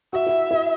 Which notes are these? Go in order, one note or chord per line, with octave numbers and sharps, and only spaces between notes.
F#4 E5
E4
E4